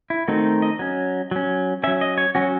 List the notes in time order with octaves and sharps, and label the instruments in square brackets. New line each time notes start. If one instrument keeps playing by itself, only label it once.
[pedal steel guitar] E4
D#3 A3 C4 D#4 F#4
D#5
F#3 C#4
F#3 C#4
F#3 C#4 E5
D#5
C#5
F#3 C#4 F#4